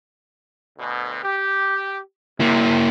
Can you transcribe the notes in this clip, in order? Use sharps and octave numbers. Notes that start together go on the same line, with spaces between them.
D2 B2
G4
C3 A#3 E4